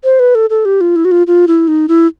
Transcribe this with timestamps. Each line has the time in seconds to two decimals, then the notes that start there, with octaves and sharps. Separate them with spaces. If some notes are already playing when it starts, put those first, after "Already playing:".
0.04 C5
0.20 B4
0.35 A4
0.50 A4
0.65 G4
0.81 F4
0.96 E4
1.05 F#4
1.11 F4
1.27 F4
1.47 E4
1.68 D#4
1.88 E4